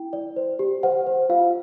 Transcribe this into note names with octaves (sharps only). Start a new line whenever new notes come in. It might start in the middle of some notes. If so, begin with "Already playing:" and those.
Already playing: E4 G5
D5
C5
G4
C5 F#5
C5
F4 F5